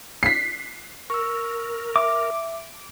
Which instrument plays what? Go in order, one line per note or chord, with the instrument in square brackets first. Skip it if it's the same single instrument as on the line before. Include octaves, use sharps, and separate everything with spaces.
[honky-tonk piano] B6 C7
[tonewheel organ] A#4 [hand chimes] C#6 E6
[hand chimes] E5 [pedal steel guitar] D6